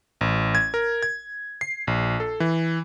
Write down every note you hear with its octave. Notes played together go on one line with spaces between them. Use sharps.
A1
G#6
A#4
G#6
C7
A#1
A4
E3